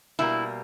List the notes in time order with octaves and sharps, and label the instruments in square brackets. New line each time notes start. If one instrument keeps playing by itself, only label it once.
[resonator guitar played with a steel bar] B2 G3 A#3 E4